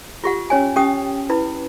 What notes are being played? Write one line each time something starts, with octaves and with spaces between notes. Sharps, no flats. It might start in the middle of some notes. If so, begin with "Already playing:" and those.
F4 G4 F#5
C#4 C#5 G#5
C#4 G4 G5 D#6
E4 B4 B5